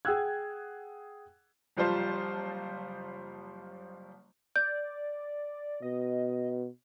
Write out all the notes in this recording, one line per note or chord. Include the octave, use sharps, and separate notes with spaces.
G#4 F#5 G5 E6 F#6 G#6
F#1 F3 G3 F4 C5 A5
D5 G6
B2 D#5